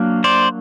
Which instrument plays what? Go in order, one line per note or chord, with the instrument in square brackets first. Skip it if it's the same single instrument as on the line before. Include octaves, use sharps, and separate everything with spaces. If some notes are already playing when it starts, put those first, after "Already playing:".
Already playing: [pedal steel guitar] F#3 A#3 D4
C5 D5